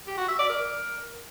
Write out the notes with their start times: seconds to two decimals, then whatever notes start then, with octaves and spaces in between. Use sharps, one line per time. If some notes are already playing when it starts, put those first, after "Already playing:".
0.07 G4
0.18 F#4
0.28 E5
0.39 D5
0.49 A#4